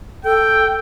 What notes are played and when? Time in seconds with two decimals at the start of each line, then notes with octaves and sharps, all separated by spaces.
0.25 A4 G5